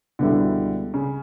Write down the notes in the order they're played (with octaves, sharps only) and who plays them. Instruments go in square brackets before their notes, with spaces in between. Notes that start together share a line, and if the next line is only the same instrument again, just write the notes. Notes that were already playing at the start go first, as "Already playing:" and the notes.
[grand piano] C#2 B2 G3 B3 E4 [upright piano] D3
[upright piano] C#3